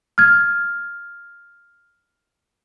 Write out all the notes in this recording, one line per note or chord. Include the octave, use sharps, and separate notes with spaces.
F6 G#6